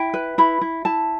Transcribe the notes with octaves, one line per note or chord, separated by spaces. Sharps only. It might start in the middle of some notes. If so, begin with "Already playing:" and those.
Already playing: E4 G5
B4
E4 B5
E4
E4 A5